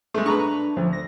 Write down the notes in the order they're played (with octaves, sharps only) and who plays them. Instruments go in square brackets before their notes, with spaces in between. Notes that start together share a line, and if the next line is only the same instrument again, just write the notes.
[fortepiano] G#3 A3
[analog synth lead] D4 [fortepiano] B4 A#5 C#6
[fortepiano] D2 [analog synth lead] F3
[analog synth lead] A#6